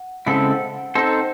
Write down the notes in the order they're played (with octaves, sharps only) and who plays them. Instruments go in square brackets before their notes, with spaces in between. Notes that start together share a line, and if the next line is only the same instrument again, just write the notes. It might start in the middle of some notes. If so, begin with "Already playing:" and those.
Already playing: [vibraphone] F#5
[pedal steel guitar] C#3 G#3 C4 E4 A4 [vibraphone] F#5
[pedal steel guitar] C4 D#4 A4 C5